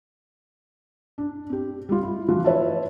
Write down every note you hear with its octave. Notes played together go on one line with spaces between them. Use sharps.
D4
C4 G4
G3 F4
E4
E3 F3 F4 F#4
B4 C#5 E5 A5